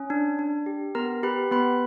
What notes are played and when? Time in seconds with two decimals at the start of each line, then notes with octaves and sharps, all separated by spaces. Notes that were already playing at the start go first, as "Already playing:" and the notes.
Already playing: C#4
0.10 D4
0.39 D4
0.66 G4
0.95 B3 A#4 A#5
1.23 G4 B4 B5
1.51 B3 B4 B5